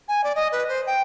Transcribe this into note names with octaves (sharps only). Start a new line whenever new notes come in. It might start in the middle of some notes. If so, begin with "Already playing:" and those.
G#5
D5
D#5
B4
C5
G5